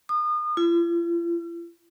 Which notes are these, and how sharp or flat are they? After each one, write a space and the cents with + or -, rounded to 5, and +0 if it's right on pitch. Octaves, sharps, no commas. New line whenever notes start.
D#6 -35
F4 -45